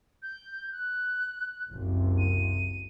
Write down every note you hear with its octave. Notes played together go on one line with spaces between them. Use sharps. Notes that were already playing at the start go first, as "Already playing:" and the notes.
G6
F#6
F#1 C2 C3
D#7